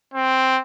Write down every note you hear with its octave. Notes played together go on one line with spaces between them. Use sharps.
C4